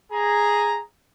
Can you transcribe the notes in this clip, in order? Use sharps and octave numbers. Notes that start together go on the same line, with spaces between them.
G#4 A#5